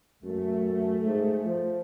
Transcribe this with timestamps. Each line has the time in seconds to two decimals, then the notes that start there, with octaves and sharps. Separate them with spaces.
0.24 F#2 A3
1.05 G#2
1.45 F3